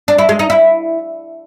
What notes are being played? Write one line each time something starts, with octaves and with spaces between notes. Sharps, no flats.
D4
E4
G#3
D#4
E4